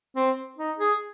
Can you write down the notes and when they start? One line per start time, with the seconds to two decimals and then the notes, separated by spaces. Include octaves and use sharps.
0.16 C4
0.58 D#4
0.78 G#4